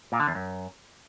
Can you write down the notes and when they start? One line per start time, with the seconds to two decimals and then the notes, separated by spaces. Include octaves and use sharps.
0.12 A#2
0.20 D3
0.27 E2
0.35 F#2